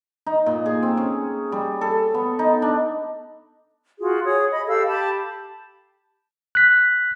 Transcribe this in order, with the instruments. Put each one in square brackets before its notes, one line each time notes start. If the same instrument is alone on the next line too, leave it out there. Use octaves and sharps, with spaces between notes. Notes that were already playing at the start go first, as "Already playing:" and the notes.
[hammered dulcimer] D#4
A#2
G#4
C4
C#4
G3
A4
B3
D#4
D4
[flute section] F4 F#4 G#4
G#4 C#5 D#6
D#5 B5
G4 A4 F5 E6
G4 A5 B5
[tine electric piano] F#6 B6